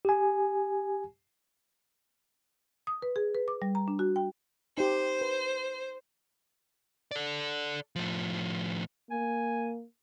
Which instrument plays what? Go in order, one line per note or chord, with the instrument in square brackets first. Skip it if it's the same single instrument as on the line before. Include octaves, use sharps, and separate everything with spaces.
[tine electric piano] G4 G#5
[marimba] D#6
B4
G#4
B4
D6
G3
A#5
D4
F#4
G5
[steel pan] D#4 G4 [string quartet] C5
[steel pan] B4
[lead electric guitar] A4 D5
A2 F3
[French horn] A#3 [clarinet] G#5